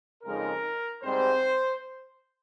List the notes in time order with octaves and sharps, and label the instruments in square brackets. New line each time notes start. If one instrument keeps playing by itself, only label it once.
[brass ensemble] F2 C#3 G#3 D#4 A#4
G#2 G3 C4 C5